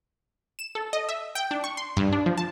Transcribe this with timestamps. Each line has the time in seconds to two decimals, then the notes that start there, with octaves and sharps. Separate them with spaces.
0.59 E7
0.75 A4
0.93 D#5
1.09 E5
1.35 G5
1.51 D4
1.64 C#6
1.77 C6
1.97 G2
2.13 D4
2.26 F3
2.38 A5